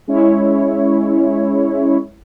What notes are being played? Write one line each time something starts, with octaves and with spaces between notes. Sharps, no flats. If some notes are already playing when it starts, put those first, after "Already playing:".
G#3 C#4 E4 C#5